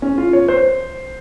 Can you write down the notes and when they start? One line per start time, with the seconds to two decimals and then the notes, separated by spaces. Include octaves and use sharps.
0.02 C#4
0.18 F4
0.33 C#5
0.48 C5